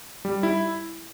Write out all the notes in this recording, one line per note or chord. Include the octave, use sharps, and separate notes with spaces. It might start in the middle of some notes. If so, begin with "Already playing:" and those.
G3
E4